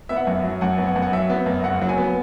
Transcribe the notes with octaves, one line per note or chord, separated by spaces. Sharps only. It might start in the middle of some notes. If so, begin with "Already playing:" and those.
B3 E5
F#5
F#2 E5
F#3
F#2 F#5
B3
F#5
F#2
F#5
F#3 E5
B3
F#2
F#1 F#5
F#3
G#5
B3